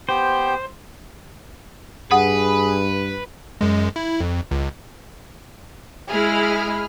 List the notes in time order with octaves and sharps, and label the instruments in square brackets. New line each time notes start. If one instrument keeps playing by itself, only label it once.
[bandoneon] B3 G4 G5 [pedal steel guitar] C5
[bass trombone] G2 [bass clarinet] G#4 [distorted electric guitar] B4 [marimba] F#5 D#6
[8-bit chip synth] F#2 G#3
E4
F2
C#2
[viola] G#3 E4 [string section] G#4 B5 F6